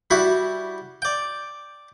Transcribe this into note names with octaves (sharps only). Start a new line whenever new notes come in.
G3 E4 F#4 E5
D5 G5